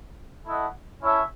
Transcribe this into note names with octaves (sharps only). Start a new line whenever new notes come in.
A3 E4 A4 D#5 F#5
C#4 E4 A4 C#5 E5